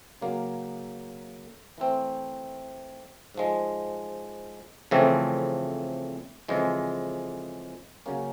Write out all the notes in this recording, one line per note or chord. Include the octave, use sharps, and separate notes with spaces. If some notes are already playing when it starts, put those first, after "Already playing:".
C#3 F#3 A#3
E3 A3 C4
G#2 F3 G#3
F2 C#3 E3 A3 C4
F2 C#3 E3 G#3
C#3 F#3 A#3 C#4